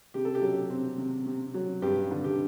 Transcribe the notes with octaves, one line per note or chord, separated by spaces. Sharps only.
C3 G4
A4
G4
F#3
C4
C3
C3
F#3
G2 G4
D3
G4